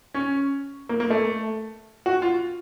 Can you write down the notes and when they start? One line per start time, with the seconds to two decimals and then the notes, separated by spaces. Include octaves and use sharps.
0.14 C#4
0.89 A#3
1.00 A#3
1.10 A3
2.06 F#4
2.22 F4